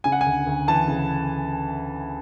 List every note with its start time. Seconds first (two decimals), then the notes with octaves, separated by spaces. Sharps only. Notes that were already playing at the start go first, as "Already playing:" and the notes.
0.04 C#3 G#5
0.12 F#5
0.21 G#5
0.26 D2
0.47 D2
0.68 E3 A5
0.88 C#3